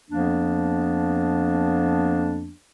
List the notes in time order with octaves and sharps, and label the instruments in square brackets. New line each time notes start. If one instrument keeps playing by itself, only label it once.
[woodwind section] F2 F3 A#3 B3 D4